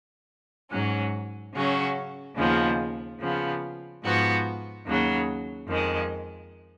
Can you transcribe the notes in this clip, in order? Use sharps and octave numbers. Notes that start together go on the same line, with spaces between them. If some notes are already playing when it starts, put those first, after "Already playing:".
G#2 F#3 C#4
C#3 F#3 C#4 F#4
D#2 C#3 F3 G#3 B3
C#3 F3 B3
G#2 F3 B3 F#4
D#2 C#3 F#3
F2 D#3 G#3